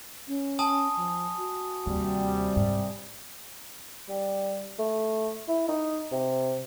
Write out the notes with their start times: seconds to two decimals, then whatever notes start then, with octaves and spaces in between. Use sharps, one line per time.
0.28 C#4
0.59 G#5 A5 D#6
0.97 F3
1.37 F#4
1.87 D#2 C3 G3
2.56 G#2
4.09 G3
4.79 A3
5.48 E4
5.68 D#4
6.12 C3